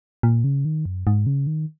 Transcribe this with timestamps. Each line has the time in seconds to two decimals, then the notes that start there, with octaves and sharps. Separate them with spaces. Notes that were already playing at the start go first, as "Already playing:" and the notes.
0.23 A#2
0.44 C#3
0.65 D#3
0.85 F#2
1.07 G#2
1.26 C#3
1.47 D#3